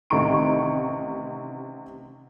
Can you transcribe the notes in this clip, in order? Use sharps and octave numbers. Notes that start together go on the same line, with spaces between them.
A1 C3 D#3 A#5 C#6 D7